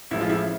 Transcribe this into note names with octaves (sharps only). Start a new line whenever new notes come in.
A1 A2 F3 G#3 E4
F4
E4